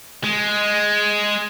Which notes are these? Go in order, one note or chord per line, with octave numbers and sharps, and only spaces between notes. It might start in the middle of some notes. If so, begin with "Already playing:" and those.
G#3